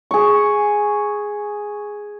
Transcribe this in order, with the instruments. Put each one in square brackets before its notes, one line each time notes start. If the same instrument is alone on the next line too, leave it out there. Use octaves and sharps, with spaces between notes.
[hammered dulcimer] G#4 C#6